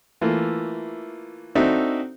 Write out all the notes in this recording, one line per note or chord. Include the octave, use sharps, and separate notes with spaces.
E3 A3 A#3 F4
C4 D4 D#4 F#4 A4 E5